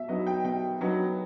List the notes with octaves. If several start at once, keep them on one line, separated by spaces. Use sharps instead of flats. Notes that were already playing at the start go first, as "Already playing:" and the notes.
Already playing: B2 E5
F#3 B3 D#4 D#5
G5
B2 G5
F#3 B3 D#4